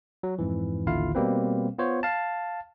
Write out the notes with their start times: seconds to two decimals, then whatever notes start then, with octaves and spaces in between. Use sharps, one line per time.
0.23 F#3
0.39 F2 G#2 E3
0.86 A1 D#2 D3 E4 F4 F5
1.15 B2 G3 A#3 C4 B4
1.78 B3 F4 C5 C#5
2.03 F5 A5